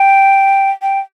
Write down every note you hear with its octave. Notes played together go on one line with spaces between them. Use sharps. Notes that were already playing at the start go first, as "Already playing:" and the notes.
Already playing: G5
G5